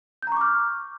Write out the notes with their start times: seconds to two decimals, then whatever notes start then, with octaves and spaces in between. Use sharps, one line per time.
0.23 G6
0.27 A#5
0.32 C#6
0.36 D6
0.41 F6